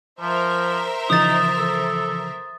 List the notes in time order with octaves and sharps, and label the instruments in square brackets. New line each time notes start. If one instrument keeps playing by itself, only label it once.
[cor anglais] F3 [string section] A#4 C5 E5
[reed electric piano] C#3 E3 F3 [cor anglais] D#4 [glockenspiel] D#6 A6
[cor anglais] A4